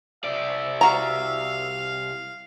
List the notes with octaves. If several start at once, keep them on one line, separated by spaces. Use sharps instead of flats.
C2 D5 E5
F#4 F5 A#5